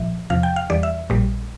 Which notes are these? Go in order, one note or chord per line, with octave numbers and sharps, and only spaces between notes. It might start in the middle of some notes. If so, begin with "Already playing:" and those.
Already playing: C2 A#2 F3 E5
E2 C3 F3 F5
G5
F5
E2 E3 G3 D5
E5
A#1 A#2 G3